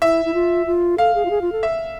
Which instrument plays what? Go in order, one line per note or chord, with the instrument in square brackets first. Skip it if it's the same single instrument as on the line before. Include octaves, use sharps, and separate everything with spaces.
[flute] E4 [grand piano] E5
[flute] E4
F4
F4
[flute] A4 [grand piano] F5
[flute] G#4
F4
G#4
F4
A4
[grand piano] E5